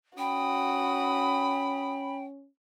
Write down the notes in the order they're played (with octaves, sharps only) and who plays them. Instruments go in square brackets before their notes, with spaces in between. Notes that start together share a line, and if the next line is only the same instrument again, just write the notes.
[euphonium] C#4 [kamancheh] F#4 D#6 [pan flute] G5 [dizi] B5